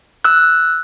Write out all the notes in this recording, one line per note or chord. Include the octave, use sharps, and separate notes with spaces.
E6 F#6